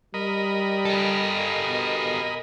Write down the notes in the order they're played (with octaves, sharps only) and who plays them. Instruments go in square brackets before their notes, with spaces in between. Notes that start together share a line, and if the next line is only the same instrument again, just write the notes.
[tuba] G3 [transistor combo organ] A#4 D#5 B5
[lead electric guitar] G4 A4
[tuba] B2